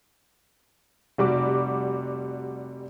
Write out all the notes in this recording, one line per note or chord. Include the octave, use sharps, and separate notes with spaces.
F1 G3 F#4 D6